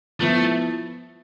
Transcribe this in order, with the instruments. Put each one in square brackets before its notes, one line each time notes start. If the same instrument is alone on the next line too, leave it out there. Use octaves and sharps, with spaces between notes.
[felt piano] F3 B3 E4 [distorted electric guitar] A3